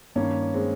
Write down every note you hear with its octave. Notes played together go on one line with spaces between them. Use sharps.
G2 D#3 A#3 C#4
G#3 C4